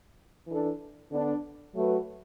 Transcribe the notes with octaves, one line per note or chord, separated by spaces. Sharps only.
E3 D4 A4
D3 B3 D4
F#3 A3 F#4 B4